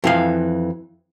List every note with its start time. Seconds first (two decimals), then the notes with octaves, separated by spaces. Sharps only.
0.04 F2 E3 F5